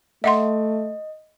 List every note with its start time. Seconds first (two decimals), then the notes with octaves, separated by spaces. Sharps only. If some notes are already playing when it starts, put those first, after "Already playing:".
0.24 A3 D#5 E5 F#5 C6